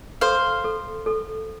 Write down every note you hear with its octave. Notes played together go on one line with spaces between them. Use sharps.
A4 C5 F5
A4
A4